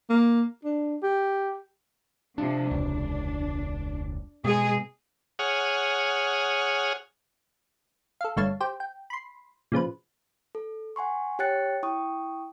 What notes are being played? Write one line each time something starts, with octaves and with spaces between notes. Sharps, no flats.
A#3
D4
G4
C3 F3 D4
E1 C#2 D4
B2 G#3 G#4
G#4 C#5 F#5 D#6 F6
A4 F5
G1 G2 A3 C#5 F5 A5
G4 C5 G5
G5
B5 C6
A#2 C#3 F3 B4
A4
F#5 G#5 C6 C#6
G4 C#5 G5 F#6 A6 C#7
E4 G5 C#6 D#6